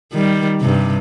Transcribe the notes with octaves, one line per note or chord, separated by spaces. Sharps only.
D#3 G3
G2 C3